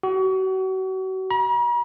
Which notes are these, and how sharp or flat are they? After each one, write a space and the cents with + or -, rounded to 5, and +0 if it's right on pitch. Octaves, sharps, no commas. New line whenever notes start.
F#4 +35
A#5 +45